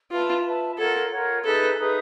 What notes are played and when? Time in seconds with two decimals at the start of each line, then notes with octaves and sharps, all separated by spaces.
0.11 F4 B4 E5 A5
0.45 B4 E5 A5
0.78 F4 A4 A#4 C#5 F#5
1.11 F4 A#4 C#5 F#5
1.44 D#4 G#4 A4 B4 E5
1.78 D#4 G#4 B4 E5